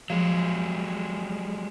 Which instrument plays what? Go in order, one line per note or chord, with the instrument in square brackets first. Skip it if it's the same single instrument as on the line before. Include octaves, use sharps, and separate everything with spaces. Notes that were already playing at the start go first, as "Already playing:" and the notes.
[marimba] F3 [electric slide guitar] F#3 G#3